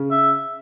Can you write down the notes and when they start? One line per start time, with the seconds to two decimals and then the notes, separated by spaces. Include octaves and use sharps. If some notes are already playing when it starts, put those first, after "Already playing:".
Already playing: C#3
0.11 E5